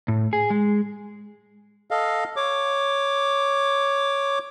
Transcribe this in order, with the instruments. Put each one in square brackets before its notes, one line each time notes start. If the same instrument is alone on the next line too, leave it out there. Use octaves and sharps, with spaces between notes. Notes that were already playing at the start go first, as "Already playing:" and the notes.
[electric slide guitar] A2
G#4
G#3
[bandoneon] A4 D#5 F5
C#5 D6